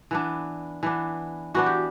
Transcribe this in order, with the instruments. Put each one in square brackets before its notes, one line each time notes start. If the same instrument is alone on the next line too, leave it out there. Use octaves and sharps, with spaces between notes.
[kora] E3 B3 D4
E3 B3 D4
E3 B3 D4 F#4
G4